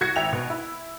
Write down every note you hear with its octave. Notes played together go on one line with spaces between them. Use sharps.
C2 F#4 G#6 A#6 C#7
G#1 E5 G5 F7
B2
E4